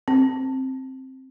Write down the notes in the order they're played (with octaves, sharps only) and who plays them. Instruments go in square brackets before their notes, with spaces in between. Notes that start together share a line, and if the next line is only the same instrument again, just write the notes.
[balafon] C4